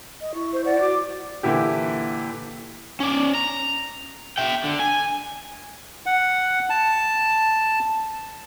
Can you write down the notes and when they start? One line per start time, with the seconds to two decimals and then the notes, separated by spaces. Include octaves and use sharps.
0.21 D#5
0.34 E4 C#6
0.53 C5
0.65 D5 F#5
0.80 F#4 D6
1.43 A#2 D3 E3 E4 G4
3.00 C#4 D5
3.35 A#5
4.38 E5 G5
4.64 D3
4.79 G#5
6.06 F#5
6.70 A5